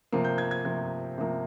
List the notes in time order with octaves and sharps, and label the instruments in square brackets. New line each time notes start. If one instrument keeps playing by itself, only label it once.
[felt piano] C3 F3 A#3
G6
G#6
G#6
C3 F3 A#3 G#6
C3 F3 A#3